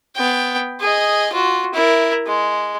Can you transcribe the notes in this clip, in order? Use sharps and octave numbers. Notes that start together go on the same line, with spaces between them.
B3 G5
G#4 D#5
F4 F#4
E4 A#4
G#3